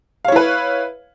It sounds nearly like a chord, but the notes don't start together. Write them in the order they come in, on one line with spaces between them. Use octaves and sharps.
F5 C#5 E4 B4